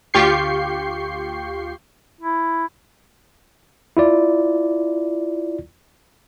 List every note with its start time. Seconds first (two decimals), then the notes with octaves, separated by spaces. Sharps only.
0.14 D2 F4 G4 C#6 G6 C7
2.21 E4
3.97 E4 F4 D5